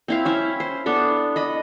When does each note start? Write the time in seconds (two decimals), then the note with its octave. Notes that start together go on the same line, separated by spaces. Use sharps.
0.08 C4 E4 F5
0.25 C#4 E4 E5
0.60 C5
0.86 B3 D4 A4
1.36 D#5 B5